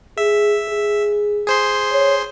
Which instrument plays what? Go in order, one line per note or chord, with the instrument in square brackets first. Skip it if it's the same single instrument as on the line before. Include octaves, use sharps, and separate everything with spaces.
[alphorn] G#4 [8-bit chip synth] E5
[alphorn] G#4
[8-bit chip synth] G#4 C5 C6
[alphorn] C#5